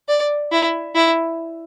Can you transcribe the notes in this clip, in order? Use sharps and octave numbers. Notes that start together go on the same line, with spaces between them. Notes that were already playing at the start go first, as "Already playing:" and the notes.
D5
E4
E4